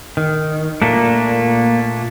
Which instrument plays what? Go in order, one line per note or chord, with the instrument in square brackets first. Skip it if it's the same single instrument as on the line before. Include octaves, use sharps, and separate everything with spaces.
[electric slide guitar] D#3
[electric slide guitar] A#2 A3 D4 [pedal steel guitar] A#3